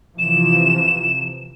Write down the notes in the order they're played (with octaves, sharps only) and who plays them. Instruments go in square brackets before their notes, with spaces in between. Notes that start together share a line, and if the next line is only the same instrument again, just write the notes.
[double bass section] C3 E3 F3 [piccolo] E7